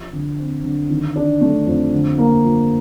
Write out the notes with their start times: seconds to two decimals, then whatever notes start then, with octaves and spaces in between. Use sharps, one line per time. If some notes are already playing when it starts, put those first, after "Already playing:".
Already playing: F3
0.13 D3
0.38 C4
0.64 D3
0.90 D#3
1.16 D4
1.41 A3
1.66 F2
1.93 D3
2.18 A#3
2.44 F3